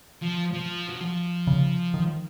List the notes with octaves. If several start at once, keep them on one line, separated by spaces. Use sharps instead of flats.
F3
F3
F#3
F3
C#3
D#3